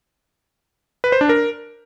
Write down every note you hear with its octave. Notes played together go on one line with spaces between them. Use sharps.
B4
C5
D4
A#4